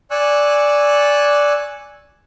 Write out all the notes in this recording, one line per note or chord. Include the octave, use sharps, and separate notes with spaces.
D5 G#5 C#6 E6 F#6